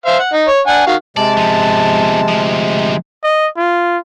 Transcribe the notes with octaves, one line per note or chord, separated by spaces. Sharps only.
C5 E5 F5
F#5
D#4
C#5
D4 F#5 G#5
D#3 F#4 F5
C3 G#3 D5 A5
F3 B3
D2 F3
D#5
F4